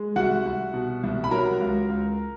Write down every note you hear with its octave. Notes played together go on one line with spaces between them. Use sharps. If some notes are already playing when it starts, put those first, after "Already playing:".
Already playing: G#3
C2 F#4 F#5
C2
B2
C2
B5
F#3 A#4 A#5
C#2
C#2